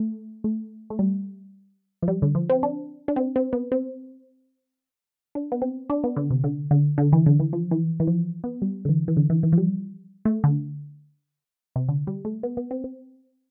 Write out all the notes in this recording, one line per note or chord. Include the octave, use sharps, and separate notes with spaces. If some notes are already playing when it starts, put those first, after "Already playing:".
Already playing: A3
A3
A3
G3
F3
G3
D3
F3
C4
D4
D4
C4
C4
B3
C4
D4
B3
C4
D4
B3
D3
C3
D3
D3
D3
E3
D3
E3
F3
E3
E3
F3
B3
G3
D3
E3
E3
D3
E3
E3
F3
G3
A3
D3
C3
D3
G3
A3
B3
B3
C4
C4